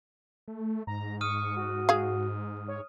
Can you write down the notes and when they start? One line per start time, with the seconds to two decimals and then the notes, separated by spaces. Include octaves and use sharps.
0.48 A3
0.87 G#2 A#5
1.21 C#6 D#6 F6 D#7
1.57 F#4
1.89 G#4 F5
2.68 C#5